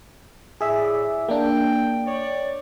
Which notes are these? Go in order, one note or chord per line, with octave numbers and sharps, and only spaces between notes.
A2 G#4 D5 E5
A#3 D4 G5
C#5 D5